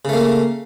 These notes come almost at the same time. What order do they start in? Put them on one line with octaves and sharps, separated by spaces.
C#3 A3 A#3